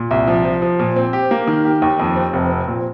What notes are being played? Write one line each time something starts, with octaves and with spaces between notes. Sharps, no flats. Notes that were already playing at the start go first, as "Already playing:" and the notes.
Already playing: A#2
C2
F3
F3
F3
A#2
C4
G4
A#3
D#3
G4
D#2
F2
C4
F1
C4
A#2